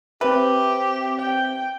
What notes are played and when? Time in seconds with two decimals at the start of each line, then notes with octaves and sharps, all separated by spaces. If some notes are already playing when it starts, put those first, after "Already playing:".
0.21 C4 G4 B4 C5 E5
1.18 G5